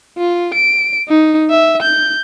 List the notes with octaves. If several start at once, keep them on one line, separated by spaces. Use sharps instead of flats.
F4
D7
D#4
E5
G6